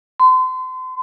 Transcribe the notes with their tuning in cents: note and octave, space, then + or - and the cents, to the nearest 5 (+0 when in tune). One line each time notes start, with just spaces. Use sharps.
C6 -35